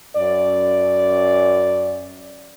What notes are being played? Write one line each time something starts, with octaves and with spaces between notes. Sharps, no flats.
F#2 D5